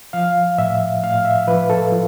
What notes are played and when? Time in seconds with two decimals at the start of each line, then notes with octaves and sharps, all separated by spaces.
0.13 F3 F5
0.58 A2 E5
1.03 A2 F5
1.25 E5
1.48 F3 B4
1.70 A4
1.92 F3